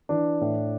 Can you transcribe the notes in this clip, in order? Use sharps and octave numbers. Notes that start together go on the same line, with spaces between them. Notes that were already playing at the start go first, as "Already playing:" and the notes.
E3 D4
A2